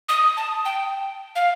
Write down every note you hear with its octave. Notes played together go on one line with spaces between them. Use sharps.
D#6
A5
G5
F5